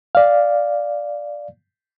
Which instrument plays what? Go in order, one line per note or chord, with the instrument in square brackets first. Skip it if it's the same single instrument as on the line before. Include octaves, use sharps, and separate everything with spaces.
[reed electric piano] D5 F5